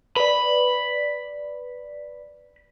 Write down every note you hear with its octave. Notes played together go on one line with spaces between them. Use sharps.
B4 D5 B5